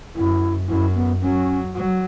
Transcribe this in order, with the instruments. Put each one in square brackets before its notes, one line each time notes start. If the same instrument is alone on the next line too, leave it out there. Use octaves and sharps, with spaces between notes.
[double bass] F#2 [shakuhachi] E4
[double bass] F#2 [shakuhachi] E4
[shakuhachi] B3
[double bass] F#3 [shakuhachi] C#4
[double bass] F#3